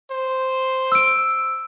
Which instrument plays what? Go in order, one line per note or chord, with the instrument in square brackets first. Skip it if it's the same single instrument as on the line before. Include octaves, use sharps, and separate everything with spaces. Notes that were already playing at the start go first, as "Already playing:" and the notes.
[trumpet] C5
[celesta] E6 D7